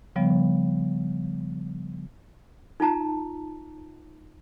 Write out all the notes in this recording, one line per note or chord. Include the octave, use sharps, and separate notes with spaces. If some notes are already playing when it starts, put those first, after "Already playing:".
C#3 F3 G3 B3
D#4 F4 A5 A#5